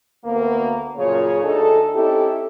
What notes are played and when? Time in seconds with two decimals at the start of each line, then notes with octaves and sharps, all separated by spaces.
0.24 D2 A#3 B3
0.97 F#2 A#2 C#3 F3 G#4 C#5
1.44 D2 D4 D#4 G#4 A4
1.94 C4 C#4 D#4 E4 G4 A4